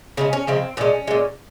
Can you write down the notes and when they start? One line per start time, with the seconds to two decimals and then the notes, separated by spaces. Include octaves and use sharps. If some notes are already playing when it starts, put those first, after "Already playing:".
0.17 C#3 F3 G#3 C#4
0.33 C#4
0.47 C#3 F3 G#3 C4
0.77 A#2 G#3 C#4
1.07 A#2 G#3